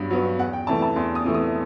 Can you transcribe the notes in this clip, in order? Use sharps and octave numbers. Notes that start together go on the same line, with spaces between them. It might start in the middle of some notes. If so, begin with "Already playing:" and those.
Already playing: G2 F#3 B3
F#3 B3
E2 F#5
G5
C3 E3 A3 A5
A5
E2 C6
D#6
C3 E3 A3
D#6